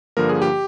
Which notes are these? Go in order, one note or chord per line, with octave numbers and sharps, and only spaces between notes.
G2 D3 F3 A#3 A#4
G#4
G4